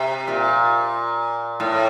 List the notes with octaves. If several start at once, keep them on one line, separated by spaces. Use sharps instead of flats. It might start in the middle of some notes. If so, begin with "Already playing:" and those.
Already playing: C3
A#2
A2